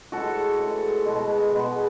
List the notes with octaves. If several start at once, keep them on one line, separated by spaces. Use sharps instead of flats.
A2 E3 G#3 F#4 A4
A2 E3 G#3
B2 G#3 B3
B2 G#3 B3